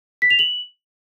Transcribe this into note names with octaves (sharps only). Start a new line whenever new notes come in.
B6
F7
F#7